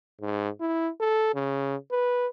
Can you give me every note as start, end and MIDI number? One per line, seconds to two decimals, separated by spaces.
0.21 0.50 44
0.61 0.90 64
1.01 1.31 69
1.35 1.76 49
1.92 2.27 71